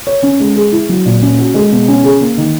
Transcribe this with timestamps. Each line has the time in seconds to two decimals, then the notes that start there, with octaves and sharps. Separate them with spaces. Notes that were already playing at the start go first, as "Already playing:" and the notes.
0.07 C#5
0.23 C#4
0.40 G#3
0.56 G#4
0.72 E4
0.89 F#3
1.05 A#2
1.22 C#4
1.39 F#4
1.54 G#3
1.72 B2
1.88 C#4
2.04 G#4
2.21 A#3
2.37 D#3